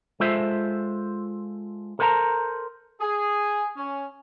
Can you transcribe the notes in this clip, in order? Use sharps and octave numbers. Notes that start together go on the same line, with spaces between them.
G#3 F4 A4 C5 E5
A4 A#4 C5 E5 A5 A#5
G#4
C#4